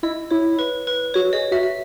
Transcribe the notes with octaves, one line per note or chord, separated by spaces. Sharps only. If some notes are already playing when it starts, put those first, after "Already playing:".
E4 D#5
E4 C#5
B4
B4
F#4 C#5
G#4 D#5
F#4 E5
E5